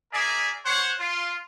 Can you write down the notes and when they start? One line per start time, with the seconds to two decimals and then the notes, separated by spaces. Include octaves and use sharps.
0.12 A#3 G#4 A#4 D5 E5 G#5
0.65 C5 C#5 F#5
0.99 F4